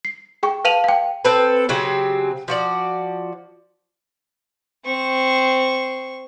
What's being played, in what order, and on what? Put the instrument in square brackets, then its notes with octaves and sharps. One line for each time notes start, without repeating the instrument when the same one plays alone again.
[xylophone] C7
G#4 G5 C#6
B4 F5 A5 D#7 F7 F#7
F5 G5
[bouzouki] C4 A4 B4
C#3 F#3 C4 G4
F3 F#4 D5
[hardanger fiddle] C4 C#6